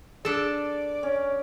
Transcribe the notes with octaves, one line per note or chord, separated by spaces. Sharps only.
D4 G#4 A4 D5
C#4